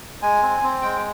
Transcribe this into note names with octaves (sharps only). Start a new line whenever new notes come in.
G#3 G#5
C4
C4
G#3 G5